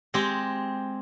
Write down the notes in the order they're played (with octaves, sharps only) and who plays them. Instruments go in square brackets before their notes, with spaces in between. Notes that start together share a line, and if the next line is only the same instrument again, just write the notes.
[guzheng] G#3 C4 G4